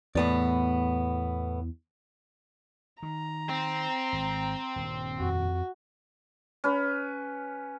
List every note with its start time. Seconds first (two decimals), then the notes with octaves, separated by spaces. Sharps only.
0.15 E2 A2 B3 D5
3.03 D#3 A#5
3.49 C4
4.13 G#1
4.76 D#1 G2
5.20 F2 F#4
6.64 C#4 B4